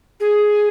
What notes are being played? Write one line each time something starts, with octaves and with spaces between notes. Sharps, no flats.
G#4